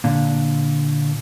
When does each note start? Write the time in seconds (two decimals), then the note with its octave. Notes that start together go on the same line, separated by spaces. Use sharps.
0.04 A#2 D3